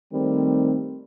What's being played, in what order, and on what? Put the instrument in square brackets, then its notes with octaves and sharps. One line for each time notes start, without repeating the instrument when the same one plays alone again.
[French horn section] D#3 G3 A3 C4